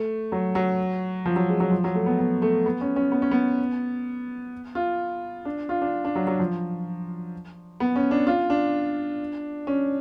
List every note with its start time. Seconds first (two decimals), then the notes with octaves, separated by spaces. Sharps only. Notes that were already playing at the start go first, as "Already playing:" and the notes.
Already playing: A3
0.32 F#3
0.55 F#3
1.26 F3
1.36 F#3
1.49 G#3
1.60 F#3
1.71 F3
1.84 F#3
1.95 A3
2.06 B3
2.19 B3
2.42 A3
2.66 B3
2.81 C#4
2.96 C#4
3.12 B3
3.22 C#4
3.31 B3
4.75 F4
5.45 D4
5.69 F4
5.82 D4
6.05 D4
6.15 F#3
6.27 F#3
6.39 F3
7.80 B3
7.96 C#4
8.11 D4
8.27 F4
8.50 D4
9.67 C#4